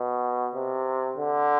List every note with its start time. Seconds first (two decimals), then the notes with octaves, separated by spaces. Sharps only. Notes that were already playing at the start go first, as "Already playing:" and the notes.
Already playing: B2
0.55 C3
1.18 D3